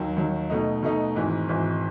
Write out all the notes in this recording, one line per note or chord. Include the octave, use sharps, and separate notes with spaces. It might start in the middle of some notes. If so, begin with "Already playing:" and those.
Already playing: D#2 D#3 F#3
D#2 D#3 F#3
B2 A3 D#4
B2 A3 D#4
G#1 G#2 E3
G#1 G#2 E3